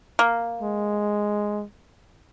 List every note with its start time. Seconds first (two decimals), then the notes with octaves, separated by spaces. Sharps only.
0.19 A#3
0.62 G#3